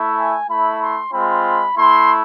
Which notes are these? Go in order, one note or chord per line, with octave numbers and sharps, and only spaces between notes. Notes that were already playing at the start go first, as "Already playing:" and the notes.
Already playing: A3 E4
G#5
A3 E4 B5
C6
G#3 C4 F4 B5
A3 E4 C6